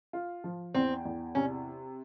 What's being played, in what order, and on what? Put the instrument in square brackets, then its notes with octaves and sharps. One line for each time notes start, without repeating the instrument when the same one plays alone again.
[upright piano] F4
F3
[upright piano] E2 [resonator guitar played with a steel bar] C4
[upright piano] E2
[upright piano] C3 [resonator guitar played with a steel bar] C#4